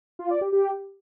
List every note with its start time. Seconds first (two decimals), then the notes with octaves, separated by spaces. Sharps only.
0.19 F4
0.30 D5
0.41 G4
0.52 G4